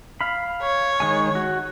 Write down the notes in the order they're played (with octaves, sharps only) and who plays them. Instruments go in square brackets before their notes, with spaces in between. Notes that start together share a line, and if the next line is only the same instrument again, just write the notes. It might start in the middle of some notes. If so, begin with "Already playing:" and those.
[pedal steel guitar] F5 B5
[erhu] C#5
[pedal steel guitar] D#3 G#3 G#5
F#4